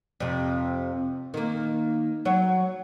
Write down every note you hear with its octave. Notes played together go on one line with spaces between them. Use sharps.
F2 C3
D#3 A#3
F#3 C#5